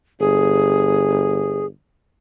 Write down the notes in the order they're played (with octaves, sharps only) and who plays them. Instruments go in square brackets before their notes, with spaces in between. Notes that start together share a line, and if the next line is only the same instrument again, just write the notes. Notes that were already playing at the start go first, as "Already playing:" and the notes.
[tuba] G1 [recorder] G#4